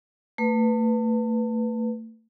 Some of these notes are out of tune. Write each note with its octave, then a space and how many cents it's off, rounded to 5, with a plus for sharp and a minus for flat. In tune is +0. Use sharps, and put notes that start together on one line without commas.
A3 +35 B4 +0